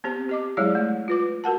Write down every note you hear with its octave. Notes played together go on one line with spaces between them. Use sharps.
B3 C4 G4 C5
G4 D#5 D6
F#3 G#3 E4 G#4 C#5 D5
A3
F4 B4 D6
F#4 A#4 F#5 A5